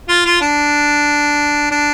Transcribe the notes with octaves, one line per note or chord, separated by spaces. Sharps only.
F4
F4
D4
D4